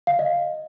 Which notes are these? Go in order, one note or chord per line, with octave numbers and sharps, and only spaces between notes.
F5
D#5